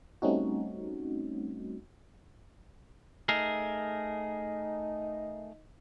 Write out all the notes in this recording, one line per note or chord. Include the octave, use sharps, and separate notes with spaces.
G3 A3 C4 C#4 D#4 F#4
A3 D#4 G#4 A#4